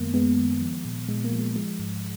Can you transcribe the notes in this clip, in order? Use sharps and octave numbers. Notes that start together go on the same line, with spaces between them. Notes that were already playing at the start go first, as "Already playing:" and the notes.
Already playing: F#2 D#3 G#3 A#3 B3
F#2 G#3 B3
D#3
F3
A#2
A#2 G#3
A#3
F3
G#3
F3 G#3
G#2